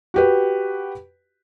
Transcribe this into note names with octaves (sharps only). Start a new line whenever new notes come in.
F#4 G4 B4